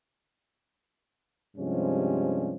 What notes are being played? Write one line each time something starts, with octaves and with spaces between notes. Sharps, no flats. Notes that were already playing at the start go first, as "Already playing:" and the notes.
G2 C3 F3 G#3 C#4